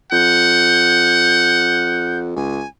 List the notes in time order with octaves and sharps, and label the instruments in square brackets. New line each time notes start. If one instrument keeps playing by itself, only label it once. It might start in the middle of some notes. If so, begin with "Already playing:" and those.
[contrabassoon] F2 [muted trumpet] F#5 [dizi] G6
[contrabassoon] C#2 [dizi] G#5